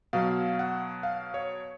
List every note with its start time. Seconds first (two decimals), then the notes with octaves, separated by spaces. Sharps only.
0.13 B2 F#3 F5
0.59 F#5
1.03 F5
1.34 C#5